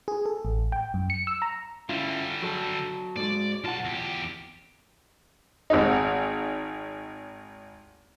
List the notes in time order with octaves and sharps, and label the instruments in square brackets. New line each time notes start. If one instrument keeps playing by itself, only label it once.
[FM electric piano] G#4
A4
A1
G5
F#2
C#7
E6
A#5
[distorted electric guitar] D3 G3 [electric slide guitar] C#4 E4 F4
[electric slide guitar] F#3 A4
[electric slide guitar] G#2 G#3 F#4 [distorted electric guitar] D5
[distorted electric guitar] B1 A5 [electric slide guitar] F4 F#5
[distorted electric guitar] E2 G4
[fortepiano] G#1 D#4